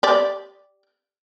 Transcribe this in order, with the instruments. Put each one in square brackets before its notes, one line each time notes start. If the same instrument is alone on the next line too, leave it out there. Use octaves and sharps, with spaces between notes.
[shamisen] G4 D5